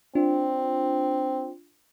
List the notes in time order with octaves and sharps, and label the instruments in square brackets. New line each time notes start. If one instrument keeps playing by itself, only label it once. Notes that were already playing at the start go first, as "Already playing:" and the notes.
[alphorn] C4 [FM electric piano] D4 F4